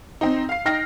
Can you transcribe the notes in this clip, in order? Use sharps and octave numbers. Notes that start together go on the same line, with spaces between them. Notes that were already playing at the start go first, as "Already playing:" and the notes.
C4 D#4
F5 C7
D#4 G5 F6 A#6 C7